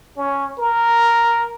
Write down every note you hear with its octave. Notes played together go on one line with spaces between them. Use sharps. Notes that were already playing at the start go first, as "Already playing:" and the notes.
C#4
A#4